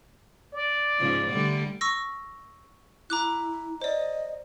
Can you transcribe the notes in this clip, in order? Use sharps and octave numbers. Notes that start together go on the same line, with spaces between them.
D5
G#2 C#3 F3
D3 G3 A3
C#6 E6 A#6
E4 A#5 D6 F#6
C5 D5 D#5